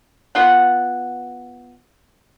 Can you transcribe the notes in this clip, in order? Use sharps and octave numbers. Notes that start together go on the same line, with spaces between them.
B3 F4 F#5